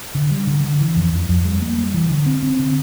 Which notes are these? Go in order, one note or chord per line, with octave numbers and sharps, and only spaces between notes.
D3
G3
D3
D3
E3
F2
F2
F2
G3
A#3
G3
E3
D3
C4
C4
D3